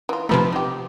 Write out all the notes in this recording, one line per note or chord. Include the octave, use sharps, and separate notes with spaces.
E3 F4
C3 F3 A3 D#4 B4
D#4 G4